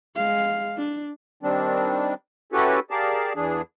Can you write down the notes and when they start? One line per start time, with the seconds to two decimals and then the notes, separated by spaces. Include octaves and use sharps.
0.16 G#3 F5
0.77 D4
1.43 D#3 G3 C4 D4
2.52 C#4 E4 F#4 G4 A4 B4
2.91 G4 G#4 A#4 D5 F5 A5
3.36 E2 E3 D4 G#4